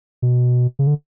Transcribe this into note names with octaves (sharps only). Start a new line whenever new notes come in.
B2
C#3
D3